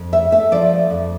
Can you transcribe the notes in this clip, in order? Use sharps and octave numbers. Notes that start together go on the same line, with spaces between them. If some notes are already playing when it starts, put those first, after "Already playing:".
Already playing: F2
A3 E5
A3 E5
F3 D5
A3
F2